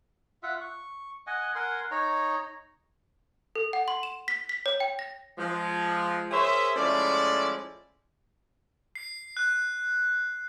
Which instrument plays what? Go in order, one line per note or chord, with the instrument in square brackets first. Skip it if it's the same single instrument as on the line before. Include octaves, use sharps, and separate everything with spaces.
[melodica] F4 E5 F#5
C#6
D#5 F#5 G#5
A#4 F#5 G#5 C6
D#4 C#5 A#5
[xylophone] A4
F#5
C6
E7
B6
B6
C#5
G5
A#6
[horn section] F3 G#3
G#4 A#4 C5 C#5 E5
F3 G#3 A3 C#4 E4 D5
[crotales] C7
F#6